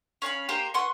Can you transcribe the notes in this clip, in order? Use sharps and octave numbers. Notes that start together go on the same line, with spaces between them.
C#4 F5 A#5 B5
A#3 G4 C5 G5
B4 F#5 C6 C#6